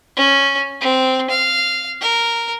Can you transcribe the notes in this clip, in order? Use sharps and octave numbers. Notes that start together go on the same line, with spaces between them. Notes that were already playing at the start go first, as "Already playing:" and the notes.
C#4
C4
F5
A#4